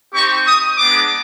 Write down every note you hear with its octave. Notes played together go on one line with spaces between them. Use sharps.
C4 D#4 G4 C#6
D#6
G#3 B3 D4 D6